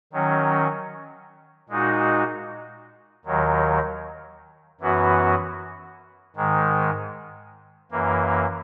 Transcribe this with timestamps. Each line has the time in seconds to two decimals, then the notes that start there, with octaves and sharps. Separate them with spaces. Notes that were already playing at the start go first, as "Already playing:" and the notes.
0.13 D#3 F#3 C#4
1.69 A#2 G#3 D#4 F#4
3.25 D#2 D#3 F#3
4.80 F#2 E3 B3 F#4
6.36 G#2 D#3 G#3
7.91 F#2 E3 A#3